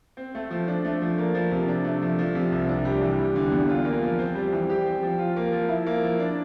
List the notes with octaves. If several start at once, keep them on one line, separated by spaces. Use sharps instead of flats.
C4
A3
F3
D4
A3
F3
A#3
F3
C3
D4
A3
F3
F3
C3
C2
D4
G3
E3
G3
D3
E2
F4
A#3
F3
C4
G3
E3
G4
C4
F3
F4
A#3
F3
E4
A#3
F3
D4